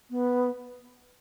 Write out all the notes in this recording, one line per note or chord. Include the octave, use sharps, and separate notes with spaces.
B3